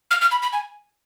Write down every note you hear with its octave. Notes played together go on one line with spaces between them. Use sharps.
F6
F6
B5
B5
G#5